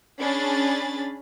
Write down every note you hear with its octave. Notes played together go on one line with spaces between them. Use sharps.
C#4 D4 G#4 B5 A6